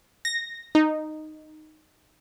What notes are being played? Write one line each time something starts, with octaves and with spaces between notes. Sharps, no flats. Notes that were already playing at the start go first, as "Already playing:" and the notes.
A#6
D#4